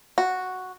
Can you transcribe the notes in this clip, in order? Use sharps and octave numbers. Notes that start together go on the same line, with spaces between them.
F#4